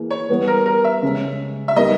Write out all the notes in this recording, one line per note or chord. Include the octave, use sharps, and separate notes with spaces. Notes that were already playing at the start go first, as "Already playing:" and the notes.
Already playing: E3 A#3 G#4
C#5
E3 G3 B3
A#4
A#4
E5
C#3 G#3 C#4
E5
G3 B3 D#4 A#4 D#5